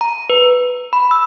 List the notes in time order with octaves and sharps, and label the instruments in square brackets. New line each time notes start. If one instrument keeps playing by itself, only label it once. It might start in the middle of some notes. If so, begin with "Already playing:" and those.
[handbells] A#5
B4
B5
E6